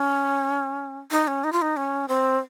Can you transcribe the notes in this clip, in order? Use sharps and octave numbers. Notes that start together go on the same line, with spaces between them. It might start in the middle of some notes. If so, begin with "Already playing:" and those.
Already playing: C#4
D#4
C#4
D#4
F4
D#4
C#4
C4